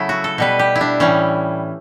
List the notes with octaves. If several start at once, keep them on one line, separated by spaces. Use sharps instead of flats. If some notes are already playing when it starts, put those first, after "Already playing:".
Already playing: C#3 F#3 A3 E4
F#4
A4
B2 G3 B4
G4
E4
D4
A2 E3 G3 C#4